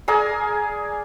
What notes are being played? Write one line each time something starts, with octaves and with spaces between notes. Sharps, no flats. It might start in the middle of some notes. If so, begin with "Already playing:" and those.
G#4 A#4 D5 G#5